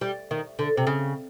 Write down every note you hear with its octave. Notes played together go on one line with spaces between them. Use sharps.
G3
D#3
D3
C3
C#3